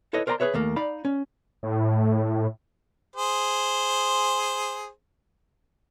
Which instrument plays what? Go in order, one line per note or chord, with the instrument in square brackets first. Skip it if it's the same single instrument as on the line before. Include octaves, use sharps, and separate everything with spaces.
[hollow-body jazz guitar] E4 A4 B4 C#5 D#5
A#4 C5 D5 G5 A#5 C6
G#4 A4 B4 C#5 E5
D#2 A3 A#3
D#4 D5 F5 B5
C#4
[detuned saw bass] A2
[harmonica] G#4 C5